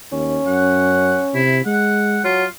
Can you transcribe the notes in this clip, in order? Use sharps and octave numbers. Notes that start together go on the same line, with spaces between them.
D#2 C#4
F#2 F#5
C3 E4
G#3 F#5
F#3 F4